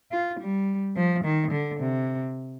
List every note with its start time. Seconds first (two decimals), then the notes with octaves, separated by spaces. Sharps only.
0.11 F4
0.40 G3
0.96 F3
1.24 D#3
1.51 D3
1.80 C3